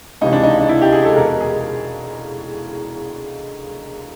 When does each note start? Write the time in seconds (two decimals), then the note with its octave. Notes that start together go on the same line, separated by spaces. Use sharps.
0.21 C#2 C3 E3 D#4
0.33 D4
0.43 D#4
0.59 D#4
0.69 E4
0.82 G4
0.92 G#4
1.05 A4
1.17 E2 B2 A#4
1.41 G#4